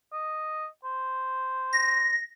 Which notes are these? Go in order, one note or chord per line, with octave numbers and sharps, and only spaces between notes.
D#5
C5
A#6